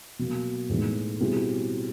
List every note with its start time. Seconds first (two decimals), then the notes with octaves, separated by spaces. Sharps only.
0.19 B2 F#3 A#3
0.69 A2 E3 G#3 B3 D#4
1.20 B2 G3 C4 E4 G#4